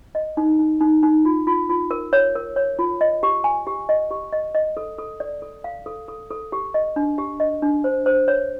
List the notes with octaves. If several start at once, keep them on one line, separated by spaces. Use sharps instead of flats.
D#5
D#4
D#4
D#4
D#4
F4
F4
F4
A#4
C#5
A#4
C#5
F4
D#5
G4
G#5
G4
D#5
G4
D#5
D#5
A4
A4
D5
A4
F5
A4
A4
A4
G4
D#5
D4
G4
D#5
D4
C5
C5
C#5